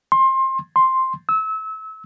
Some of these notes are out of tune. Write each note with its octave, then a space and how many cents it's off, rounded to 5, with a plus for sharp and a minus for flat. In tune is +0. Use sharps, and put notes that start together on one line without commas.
C6 +25
C6 +5
E6 -30